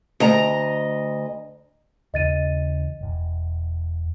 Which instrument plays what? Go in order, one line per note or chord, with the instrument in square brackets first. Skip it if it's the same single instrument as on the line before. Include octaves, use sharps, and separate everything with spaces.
[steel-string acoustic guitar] D2 D#5 A#5
[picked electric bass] D#2 C#3 E3 [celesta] D#5 A6 D#7
[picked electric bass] E1 E2